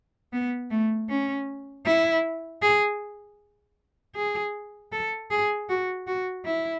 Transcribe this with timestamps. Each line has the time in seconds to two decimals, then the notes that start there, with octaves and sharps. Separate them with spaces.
0.33 B3
0.71 A3
1.09 C#4
1.86 E4
2.63 G#4
4.16 G#4
4.92 A4
5.31 G#4
5.69 F#4
6.07 F#4
6.46 E4